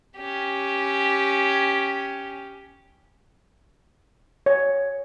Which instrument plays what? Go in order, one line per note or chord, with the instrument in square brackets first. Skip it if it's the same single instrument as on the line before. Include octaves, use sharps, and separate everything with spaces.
[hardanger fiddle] C#4 G4
[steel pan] C#5